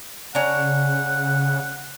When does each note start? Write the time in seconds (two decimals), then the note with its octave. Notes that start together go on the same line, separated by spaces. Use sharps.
0.35 C#3 C#4 D4 F#5 A#5